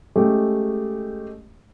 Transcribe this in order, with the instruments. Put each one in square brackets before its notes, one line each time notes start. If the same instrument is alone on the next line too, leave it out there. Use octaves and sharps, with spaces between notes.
[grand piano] G#3 A3 C#4 G4